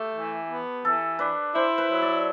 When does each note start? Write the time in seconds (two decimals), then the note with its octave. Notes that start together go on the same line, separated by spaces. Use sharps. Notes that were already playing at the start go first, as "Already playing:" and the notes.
Already playing: A3 G4 A4
0.14 E3
0.49 B3
0.85 E3 A4
1.19 D4 B4
1.55 E4 C5
1.78 B4
1.90 F#3
2.02 D5